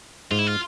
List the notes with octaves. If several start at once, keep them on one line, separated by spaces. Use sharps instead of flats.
G#2 F4
E4
F4